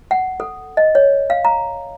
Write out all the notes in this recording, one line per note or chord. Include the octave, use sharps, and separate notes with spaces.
F#5
A4
D#5
C#5
F5
A#5